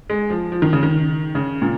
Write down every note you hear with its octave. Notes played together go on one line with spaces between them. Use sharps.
G#3
F3
F3
D#3
C#3
D#3
C#3
A#2